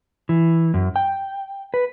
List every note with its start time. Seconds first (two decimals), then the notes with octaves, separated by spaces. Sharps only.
0.29 E3
0.74 F#2
0.96 G5
1.74 B4